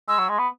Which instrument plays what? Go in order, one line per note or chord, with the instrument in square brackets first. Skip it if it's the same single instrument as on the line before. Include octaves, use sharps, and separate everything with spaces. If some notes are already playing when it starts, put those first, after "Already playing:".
[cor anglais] G#3 [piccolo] E6
[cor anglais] F#3
G#3
B3